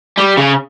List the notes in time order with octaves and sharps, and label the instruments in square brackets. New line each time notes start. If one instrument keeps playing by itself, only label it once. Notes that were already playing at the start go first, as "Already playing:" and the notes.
[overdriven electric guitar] G3
C#3